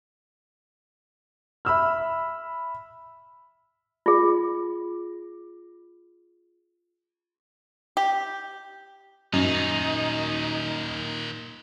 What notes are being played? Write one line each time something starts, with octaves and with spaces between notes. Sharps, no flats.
E5 B5 E6 F6
F4 G#4
G4
F#2 A#2 D#3 D#4